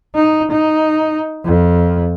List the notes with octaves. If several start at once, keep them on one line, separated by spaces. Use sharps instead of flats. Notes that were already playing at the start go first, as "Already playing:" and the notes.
D#4
D#4
F2